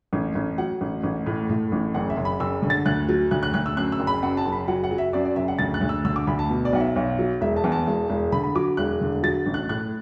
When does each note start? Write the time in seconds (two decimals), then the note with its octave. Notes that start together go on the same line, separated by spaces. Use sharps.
0.13 A1
0.35 A1
0.58 F#3 F#5
0.81 A1
1.03 A1
1.26 A2
1.49 A2
1.72 A1
1.94 F#1 F#5
2.10 E5
2.17 F#1
2.25 B5
2.40 F#1 E6
2.62 D3
2.70 A6
2.86 D2 F#6
3.09 F#3
3.31 D2 F#6
3.43 F#6
3.54 D2 F#6
3.66 E6
3.77 F#2 F#6
3.92 E6
4.00 F#1
4.07 B5
4.22 F#2 F#5
4.37 A5
4.45 F#1
4.52 B5
4.68 F#3 F#5
4.84 F#5
4.91 F#3
4.98 E5
5.13 F#2 D5
5.25 D5
5.36 F#1 E5
5.48 F#5
5.59 D2 A6
5.74 F#6
5.81 D2
5.89 E6
6.05 D3 E6
6.16 D6
6.27 D2 B5
6.39 A5
6.50 B2
6.65 D5
6.73 B1 F#5
6.80 E5
6.96 B1
7.19 F#3
7.41 E1 E5
7.56 A5
7.64 E2
7.72 A5
7.87 E1
8.10 E1
8.32 D3 B5
8.44 B5
8.55 F#3 D6
8.77 E1 F#6
9.01 D3
9.23 F#3 A6
9.46 A1
9.54 F#6
9.69 A2 F#6